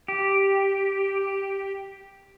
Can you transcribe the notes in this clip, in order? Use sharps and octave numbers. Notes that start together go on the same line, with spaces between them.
G4